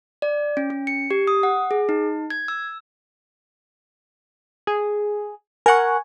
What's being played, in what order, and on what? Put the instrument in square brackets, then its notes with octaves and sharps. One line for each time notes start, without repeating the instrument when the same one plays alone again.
[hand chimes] D5
C#4
C#4
C#7
G4
D#6
F#5
G#4
D#4
G#6
E6
[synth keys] G#4
[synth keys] A#4 F#5 [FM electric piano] G#5 C#6